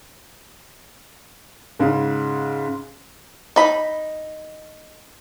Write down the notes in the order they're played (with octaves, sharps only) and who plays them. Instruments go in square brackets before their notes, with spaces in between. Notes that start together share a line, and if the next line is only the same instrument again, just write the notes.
[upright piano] G#2 C#3
[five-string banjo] D#4 B5